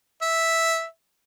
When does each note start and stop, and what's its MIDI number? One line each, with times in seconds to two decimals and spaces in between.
0.22 0.85 76